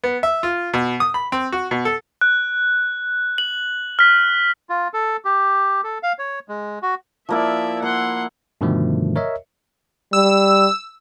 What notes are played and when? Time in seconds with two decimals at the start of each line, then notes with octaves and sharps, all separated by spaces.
0.04 B3
0.23 E5
0.43 F4
0.74 B2
1.00 D#6
1.14 B5
1.32 C4
1.52 F#4
1.71 B2
1.85 A4
2.21 F#6
3.38 F#7
3.99 F6 B6
4.69 F4
4.94 A4
5.25 G4
5.84 A4
6.03 F5
6.19 C#5
6.49 G#3
6.83 F#4
7.29 F3 A#3 E4 D5 E5
7.82 A#3 F#5 C6
8.61 G2 B2 D3 D#3 F3 A3
9.16 A#4 C#5 D#5 E5
10.13 G3 E6